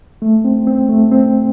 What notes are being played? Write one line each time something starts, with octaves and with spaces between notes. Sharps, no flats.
A3
C4
C4
A3
C4